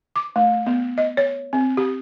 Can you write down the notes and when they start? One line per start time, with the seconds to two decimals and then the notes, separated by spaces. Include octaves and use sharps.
0.16 D6
0.36 A3
0.66 B3
0.98 D#5
1.17 C#5
1.53 C4
1.77 G4